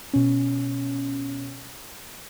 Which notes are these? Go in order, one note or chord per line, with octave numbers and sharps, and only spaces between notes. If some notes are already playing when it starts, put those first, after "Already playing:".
B2 C#4